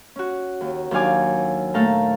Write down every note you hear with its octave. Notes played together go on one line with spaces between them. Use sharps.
C#4 F#4
D#2
D#2 F#3 D4 F5 G#5 D6
A#2 A3 A4 F5 A#5